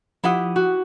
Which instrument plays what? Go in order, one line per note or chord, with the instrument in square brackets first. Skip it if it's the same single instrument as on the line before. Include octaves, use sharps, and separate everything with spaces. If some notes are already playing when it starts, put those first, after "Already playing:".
[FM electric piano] F3 D#6 [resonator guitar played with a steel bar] E4 G4 F#5
[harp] F#4